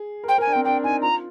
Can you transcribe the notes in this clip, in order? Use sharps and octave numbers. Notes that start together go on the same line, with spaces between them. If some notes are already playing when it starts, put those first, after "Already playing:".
Already playing: G#4
A#4
C5 G5
A#4
G#5
D4
C4 G5
D4 G5
D#4 G#5
F4 A#5